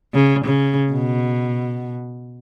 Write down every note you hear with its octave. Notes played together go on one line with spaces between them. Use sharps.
C#3
C#3
B2